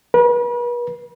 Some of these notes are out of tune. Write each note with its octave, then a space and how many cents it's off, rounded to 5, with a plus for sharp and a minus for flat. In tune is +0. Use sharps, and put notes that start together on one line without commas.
B4 -40